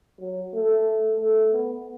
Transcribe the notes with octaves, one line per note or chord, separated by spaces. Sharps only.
F#3
A3
A3
B3